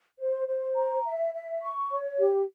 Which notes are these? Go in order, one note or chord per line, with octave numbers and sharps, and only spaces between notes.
C5
C5
A#5
E5
E5
C#6
C#5
G4